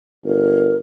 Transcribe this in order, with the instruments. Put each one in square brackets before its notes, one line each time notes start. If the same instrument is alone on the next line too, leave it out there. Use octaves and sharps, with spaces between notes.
[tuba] G1 [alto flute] A#4